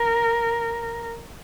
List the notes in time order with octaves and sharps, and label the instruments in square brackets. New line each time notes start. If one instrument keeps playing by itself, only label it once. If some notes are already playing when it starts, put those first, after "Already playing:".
Already playing: [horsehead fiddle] A#4